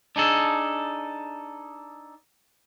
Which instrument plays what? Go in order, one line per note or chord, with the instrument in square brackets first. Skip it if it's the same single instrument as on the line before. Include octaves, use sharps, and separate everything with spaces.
[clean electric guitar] D4 D#4 G#4 A4